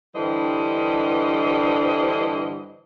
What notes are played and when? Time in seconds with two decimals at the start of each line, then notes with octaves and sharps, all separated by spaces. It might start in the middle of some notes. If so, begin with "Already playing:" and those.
0.15 G2 D3 E3 G3 C5 D#5